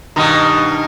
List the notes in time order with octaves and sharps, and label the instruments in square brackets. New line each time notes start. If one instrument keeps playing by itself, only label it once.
[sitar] G2 B2 D#3